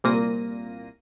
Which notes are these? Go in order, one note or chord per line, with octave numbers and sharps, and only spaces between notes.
C2 A#2 A#3 A#6 D#7